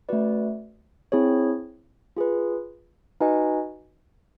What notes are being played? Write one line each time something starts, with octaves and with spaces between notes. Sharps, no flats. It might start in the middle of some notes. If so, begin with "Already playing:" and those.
A3 C#4 F#4 B4 D5
C4 E4 G#4 C#5
F4 G#4 B4
D#4 F#4 B4 D#5 G#5